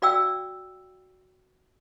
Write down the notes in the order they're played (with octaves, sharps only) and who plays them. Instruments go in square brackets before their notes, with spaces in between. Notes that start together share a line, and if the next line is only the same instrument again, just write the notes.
[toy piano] F#4 D5 F5 G5 E6